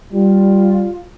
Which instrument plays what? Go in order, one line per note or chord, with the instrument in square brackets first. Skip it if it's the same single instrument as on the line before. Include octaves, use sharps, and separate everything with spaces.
[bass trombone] G3 [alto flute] F4